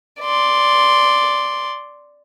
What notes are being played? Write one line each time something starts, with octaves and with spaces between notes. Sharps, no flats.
D5 C6